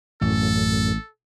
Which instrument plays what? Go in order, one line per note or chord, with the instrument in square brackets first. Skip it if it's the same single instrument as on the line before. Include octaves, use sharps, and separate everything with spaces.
[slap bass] A1 [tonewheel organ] F#2 A2 [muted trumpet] A4